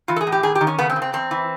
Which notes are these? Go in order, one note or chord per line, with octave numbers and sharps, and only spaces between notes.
E3 F4
A4
G#4
A2
G4
D#3 G#4
G4
D#3
C#4
C#3 B3
C4
C#3
C4
E2 C4
E3